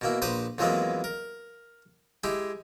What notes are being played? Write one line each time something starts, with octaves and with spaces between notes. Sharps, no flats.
B2 A#3 E4
A#1 B4 C5 A#5 D6
F2 E3 F#3 G#3 A#3 B3
A#4
G#3 E4 G4